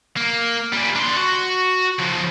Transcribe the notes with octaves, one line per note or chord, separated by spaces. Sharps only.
A#3
A#2 G3
D4 C6
F#4
C#3 F3